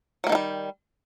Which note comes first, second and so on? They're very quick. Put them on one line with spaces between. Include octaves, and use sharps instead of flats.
F#3 A#3 D#3 A3 G3